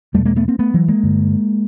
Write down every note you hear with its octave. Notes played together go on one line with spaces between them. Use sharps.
E2 B2 G3 A3
G#3 A#3
A3 B3
A#3 C4
A3 B3
E3 F#3
G#3 A#3
G2 D3